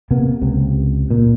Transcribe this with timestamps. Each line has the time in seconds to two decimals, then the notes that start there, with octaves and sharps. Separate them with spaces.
0.11 C3 A#3 B3
0.41 C#2 C3
1.11 A#2